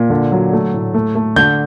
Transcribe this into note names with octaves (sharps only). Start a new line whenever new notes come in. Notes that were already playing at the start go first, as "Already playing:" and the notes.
Already playing: A#2
D3
F#3
A3
A2
A3
A3
D3 G6